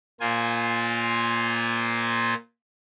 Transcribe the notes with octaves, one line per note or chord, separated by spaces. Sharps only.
A#2 A#3 F4 C5 G#5